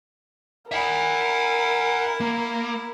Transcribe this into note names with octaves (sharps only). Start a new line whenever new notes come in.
E4 A#4 E5 F#5
A#3